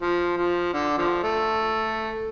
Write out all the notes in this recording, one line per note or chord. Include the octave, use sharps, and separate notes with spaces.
F3
F3
D3
D3 F3
A3